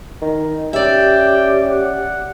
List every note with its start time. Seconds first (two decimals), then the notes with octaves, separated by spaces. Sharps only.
0.22 D#3
0.73 C#4 G4 D5 E5 G5
1.68 F#5